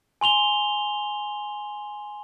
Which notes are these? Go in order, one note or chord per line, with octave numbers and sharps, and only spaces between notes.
G#5 C6 F7 G7